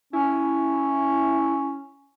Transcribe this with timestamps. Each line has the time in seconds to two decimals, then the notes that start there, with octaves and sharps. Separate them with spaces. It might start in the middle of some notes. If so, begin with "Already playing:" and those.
0.13 C#4 E4